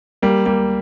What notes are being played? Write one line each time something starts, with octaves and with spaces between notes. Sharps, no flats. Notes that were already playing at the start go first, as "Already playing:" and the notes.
G3 A#3
G3 A#3